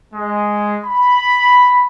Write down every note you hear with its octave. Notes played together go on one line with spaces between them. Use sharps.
G#3
B5